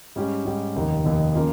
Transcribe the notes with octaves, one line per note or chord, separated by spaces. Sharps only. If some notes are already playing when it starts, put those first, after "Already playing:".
G#2 G3 C#4 G4
G#2 G3 C#4 G4
F1 D#2 D#3
F1 D#2 D#3
C#3 F3 A#3 F4